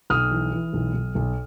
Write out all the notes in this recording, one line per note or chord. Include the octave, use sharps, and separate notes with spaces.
B1 D#6 F6
E3
E3
B1
B1
B1